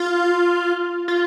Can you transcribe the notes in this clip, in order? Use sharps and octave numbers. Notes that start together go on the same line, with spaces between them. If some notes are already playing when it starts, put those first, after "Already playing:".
Already playing: F4
F4